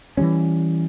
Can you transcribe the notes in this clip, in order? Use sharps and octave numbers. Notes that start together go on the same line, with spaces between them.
E3 F3 G3 C#4